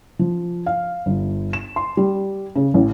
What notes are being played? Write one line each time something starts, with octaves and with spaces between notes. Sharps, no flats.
F3
F5
G1
E7
C6
G3
C#3
A1